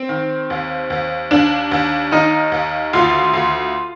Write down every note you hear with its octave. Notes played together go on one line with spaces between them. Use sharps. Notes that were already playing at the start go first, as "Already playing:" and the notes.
Already playing: C4
D#3
D#2
D#2
D#2 D4
D#2
D#3 D#4
D#2
D2 F4
D2